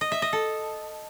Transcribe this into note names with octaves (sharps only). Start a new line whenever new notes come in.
D#5
E5
D#5
A4